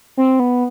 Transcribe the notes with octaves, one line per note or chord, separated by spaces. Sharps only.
C4
B3